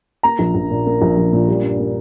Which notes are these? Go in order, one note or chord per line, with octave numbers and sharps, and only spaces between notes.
A#3 A#5
A#1
A#1
A#2
A#3
A#1
A#1
A#2
G3
G2
A#3